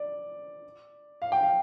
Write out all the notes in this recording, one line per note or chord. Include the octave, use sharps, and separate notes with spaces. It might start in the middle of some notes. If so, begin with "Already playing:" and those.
Already playing: D5
F5
G5
F5